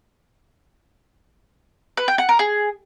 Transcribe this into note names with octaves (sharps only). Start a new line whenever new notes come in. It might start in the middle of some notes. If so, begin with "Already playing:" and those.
B4
G5
F#5
A#4
G#4